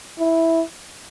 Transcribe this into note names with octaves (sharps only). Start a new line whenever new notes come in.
E4